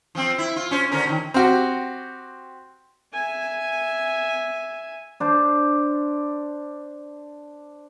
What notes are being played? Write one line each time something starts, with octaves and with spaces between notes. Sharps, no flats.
F3 C4
E4
F4
C#4 C5
D3 C#4 A#4
A#2 D#3
C4 F#4 G4
E5 G#5
D4 C5